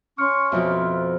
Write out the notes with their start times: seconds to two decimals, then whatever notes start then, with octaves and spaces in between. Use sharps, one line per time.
0.18 C#4 C6 C#6 F6
0.52 F2 B2 F3 E5